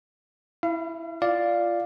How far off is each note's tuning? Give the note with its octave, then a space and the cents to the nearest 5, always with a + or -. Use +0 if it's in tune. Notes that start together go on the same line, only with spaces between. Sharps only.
E4 +0 F5 -40
F4 -15 D5 +0 F5 +0